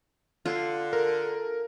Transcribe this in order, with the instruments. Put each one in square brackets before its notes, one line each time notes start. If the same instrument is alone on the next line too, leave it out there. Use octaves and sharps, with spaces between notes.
[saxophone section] D3 [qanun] F4
[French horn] A4 [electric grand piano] A#4